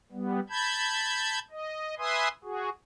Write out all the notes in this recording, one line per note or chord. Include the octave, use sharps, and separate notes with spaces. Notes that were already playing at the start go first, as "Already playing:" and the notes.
G3 B3
A5 B5 G6 G#6
D#5
B4 E5 G#5 C6 D#6
F#4 G#4